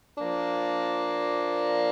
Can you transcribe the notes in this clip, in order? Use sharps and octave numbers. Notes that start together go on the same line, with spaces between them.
F3 A#3 D4